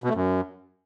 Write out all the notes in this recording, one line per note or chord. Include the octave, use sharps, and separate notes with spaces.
B2
A3
F#2